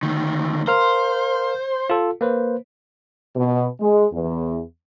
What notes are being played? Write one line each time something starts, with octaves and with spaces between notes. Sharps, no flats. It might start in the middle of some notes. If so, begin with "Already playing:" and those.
D2 D#3
A#4 C5 F5 F6
F4 A4
A#3 B4 C5
B2
G#3
E2